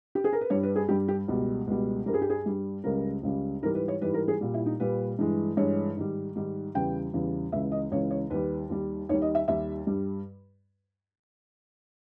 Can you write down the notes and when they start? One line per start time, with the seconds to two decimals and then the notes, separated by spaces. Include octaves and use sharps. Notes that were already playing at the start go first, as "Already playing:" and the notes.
0.15 G4
0.24 G#4
0.33 A#4
0.41 B4
0.50 G2 G3 C#5
0.63 B4
0.76 G#4
0.89 G2 G3 G4
1.08 G4
1.28 C#2 B2 G3
1.67 C#2 B2 G3
2.06 G2 G3 A#4
2.14 G#4
2.22 G4
2.30 G#4
2.46 G2 G3
2.84 C#2 C#3 G3 A#4
3.23 C#2 C#3 G3
3.62 G#2 E3 G3 A#4
3.75 B4
3.88 C#5
4.01 G#2 E3 G3 B4
4.14 A#4
4.28 G#4
4.41 A#2 G3
4.54 E4
4.66 D#4
4.80 A#2 G3 B4
5.19 G2 E3 G#3
5.57 G2 E3 G#3 C#5
5.96 G#2 D#3 G3
6.35 G#2 D#3 G3
6.74 E2 C#3 E3 G3 G5
7.13 E2 C#3 E3 G3
7.52 C#2 C#3 E3 E5
7.72 D#5
7.91 C#2 C#3 E3 C#5
8.11 C#5
8.30 D#2 D#3 G3 B4
8.69 D#2 D#3 G3
9.09 D#2 D#3 G3 C#5
9.22 D#5
9.35 E5
9.48 D#2 D#3 G3 E5
9.87 G2 G3